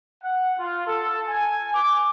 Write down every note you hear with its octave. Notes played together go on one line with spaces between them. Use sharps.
F#5
F4
A4
G#5
D6